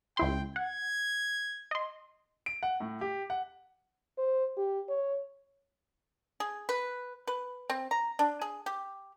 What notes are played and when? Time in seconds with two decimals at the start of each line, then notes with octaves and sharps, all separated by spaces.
0.17 C#2 E4 G5 C6
0.56 F#5 G#6
1.71 D#5 C6
2.46 D7
2.63 F#5
2.80 A2
3.01 G4
3.30 F#5
4.18 C5
4.57 G4
4.89 C#5
6.40 G#4
6.69 B4
7.27 B4
7.70 C4
7.91 A#5
8.19 D4
8.41 G#4
8.66 G4